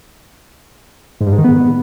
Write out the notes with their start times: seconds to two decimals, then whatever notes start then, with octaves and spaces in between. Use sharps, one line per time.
1.21 G#2
1.27 G2
1.32 G#2
1.38 D#3
1.44 B3